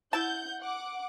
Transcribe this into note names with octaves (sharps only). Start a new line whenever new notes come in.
E4 F#5 A5 G6
F#5 D6